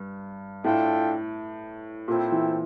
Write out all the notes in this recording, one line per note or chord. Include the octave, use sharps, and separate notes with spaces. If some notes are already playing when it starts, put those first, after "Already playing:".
Already playing: G2
A2 D4 F4 A4 E5 G5
A#2 C4 E4 A4 C5 G5
E3